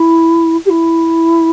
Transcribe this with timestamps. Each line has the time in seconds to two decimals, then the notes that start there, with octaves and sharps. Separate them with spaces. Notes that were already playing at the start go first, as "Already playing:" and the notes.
Already playing: E4
0.65 G4
0.69 E4